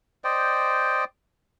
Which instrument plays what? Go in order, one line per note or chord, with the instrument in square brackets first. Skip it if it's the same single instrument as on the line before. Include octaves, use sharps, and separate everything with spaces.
[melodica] C5 D5 D#5 G5